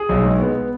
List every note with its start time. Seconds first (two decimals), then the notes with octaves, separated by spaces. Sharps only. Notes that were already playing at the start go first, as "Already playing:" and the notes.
Already playing: G#4
0.09 B1
0.24 G#3
0.40 B3